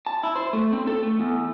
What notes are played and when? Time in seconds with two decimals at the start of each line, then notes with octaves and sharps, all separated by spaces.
0.07 A5
0.23 E4
0.36 C5
0.53 A3
0.73 C4
0.87 A4
1.03 A3
1.20 E2